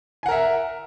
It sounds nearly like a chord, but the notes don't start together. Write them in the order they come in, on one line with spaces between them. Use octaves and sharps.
G#5 F#5 A#4 E5